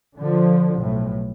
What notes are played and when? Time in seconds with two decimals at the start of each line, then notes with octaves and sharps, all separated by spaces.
0.18 D3 F3
0.77 B1 A2